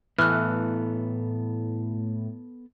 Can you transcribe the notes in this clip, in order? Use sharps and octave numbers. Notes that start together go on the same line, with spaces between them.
A2 E3 B3 A4 F6 F#6